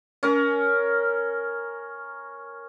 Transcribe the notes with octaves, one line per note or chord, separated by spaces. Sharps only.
C#4 A#4